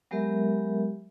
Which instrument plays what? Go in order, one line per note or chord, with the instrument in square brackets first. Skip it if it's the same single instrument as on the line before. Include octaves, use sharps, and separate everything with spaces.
[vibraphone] F#3 G#3 B3 G4 A#4 E5